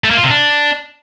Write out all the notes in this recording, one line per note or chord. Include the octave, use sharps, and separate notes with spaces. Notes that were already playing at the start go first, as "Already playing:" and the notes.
A3
A#3
F4
C3
D4